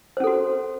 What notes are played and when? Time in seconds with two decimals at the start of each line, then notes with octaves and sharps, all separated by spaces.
0.17 C5
0.20 C#4
0.24 A4
0.27 F#4